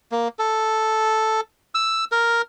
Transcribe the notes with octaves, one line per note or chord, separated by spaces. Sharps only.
A#3
A4
E6
A#4